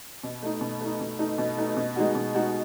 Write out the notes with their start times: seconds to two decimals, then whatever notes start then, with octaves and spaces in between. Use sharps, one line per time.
0.23 B2
0.43 A3 D#4
0.61 B2
0.81 A3 D#4
1.00 B2
1.19 A3 D#4
1.38 B2
1.58 A3 D#4
1.77 B2
1.96 G#3 D#4 F#4
2.15 B2
2.35 G#3 D#4 F#4